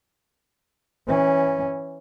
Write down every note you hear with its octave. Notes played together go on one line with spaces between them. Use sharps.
E3 C#4